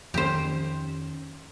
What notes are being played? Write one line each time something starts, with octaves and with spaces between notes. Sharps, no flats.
F2 D#3 C#4 G4 C5